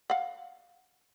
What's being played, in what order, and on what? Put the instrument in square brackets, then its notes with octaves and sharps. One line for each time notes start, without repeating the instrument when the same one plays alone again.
[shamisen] F5 F#5